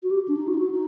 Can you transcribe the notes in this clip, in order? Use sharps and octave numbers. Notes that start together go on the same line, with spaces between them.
F#4
G4
D4
D#4
F#4
D#4
F#4
D#4